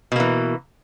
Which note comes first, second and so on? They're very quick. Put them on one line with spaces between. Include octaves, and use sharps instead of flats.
B2 A#3 E3